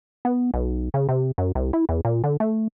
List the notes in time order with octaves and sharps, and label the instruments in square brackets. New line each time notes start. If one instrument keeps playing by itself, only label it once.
[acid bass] B3
B1
C#3
C3
F#2
C2
E4
E2
A#2
D3
A3